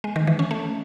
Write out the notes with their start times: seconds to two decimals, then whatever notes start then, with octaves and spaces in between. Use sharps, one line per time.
0.04 G#3
0.16 D#3
0.27 E3
0.39 C#4
0.51 A3